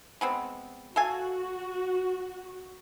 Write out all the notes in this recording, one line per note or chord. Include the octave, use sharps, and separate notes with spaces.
G#3 B3 C4
F#4 A4 F5 G#5